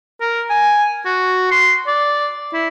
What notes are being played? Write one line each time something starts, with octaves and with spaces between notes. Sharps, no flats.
A#4
G#5
F#4
C6
D5
E4